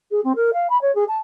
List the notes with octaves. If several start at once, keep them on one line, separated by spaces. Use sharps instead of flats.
G#4
C4
A#4
F5
B5
C#5
G#4
A5